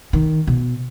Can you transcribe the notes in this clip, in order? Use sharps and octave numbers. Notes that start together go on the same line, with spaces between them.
D#3
B2